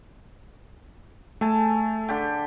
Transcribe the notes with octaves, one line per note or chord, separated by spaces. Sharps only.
A3 A4 G#5 A5
D3 G4